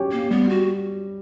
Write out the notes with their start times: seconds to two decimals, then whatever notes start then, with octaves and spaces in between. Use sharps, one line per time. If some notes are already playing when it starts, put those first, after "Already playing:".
Already playing: F#3 C#4 G4 C#5
0.12 A#3
0.30 G3 B3
0.49 F#4